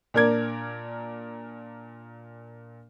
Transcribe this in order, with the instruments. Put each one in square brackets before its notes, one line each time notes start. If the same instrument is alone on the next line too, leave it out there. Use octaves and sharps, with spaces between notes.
[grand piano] A#2 D4 A#4 D5 G#6